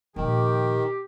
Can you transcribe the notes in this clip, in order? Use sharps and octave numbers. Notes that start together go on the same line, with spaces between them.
A#2 D#3 F3 G4